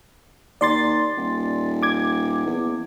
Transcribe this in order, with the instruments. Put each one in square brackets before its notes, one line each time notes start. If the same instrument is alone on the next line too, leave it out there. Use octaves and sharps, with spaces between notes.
[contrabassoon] D#2 [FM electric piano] D5 C6 A6
[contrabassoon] D#1
[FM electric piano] D6 G#6
[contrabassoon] E2